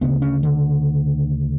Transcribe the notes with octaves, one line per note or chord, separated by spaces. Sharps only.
D2 C#3 B3
C#4
D3